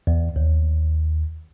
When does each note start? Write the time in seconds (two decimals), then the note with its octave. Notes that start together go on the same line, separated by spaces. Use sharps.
0.07 E2
0.36 D#2